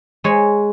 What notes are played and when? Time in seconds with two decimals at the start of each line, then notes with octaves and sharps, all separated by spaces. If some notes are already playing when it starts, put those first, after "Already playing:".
0.24 G#3 C#5